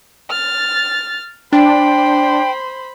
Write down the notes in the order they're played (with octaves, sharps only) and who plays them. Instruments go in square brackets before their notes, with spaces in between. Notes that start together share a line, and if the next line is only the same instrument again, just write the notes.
[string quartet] F6 A6
[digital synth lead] D4 [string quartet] C5 B5 C6 [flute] G5